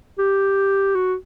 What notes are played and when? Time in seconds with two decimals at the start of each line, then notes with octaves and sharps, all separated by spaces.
0.18 G4
0.95 F#4